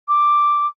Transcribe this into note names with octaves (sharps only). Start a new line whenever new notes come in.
D6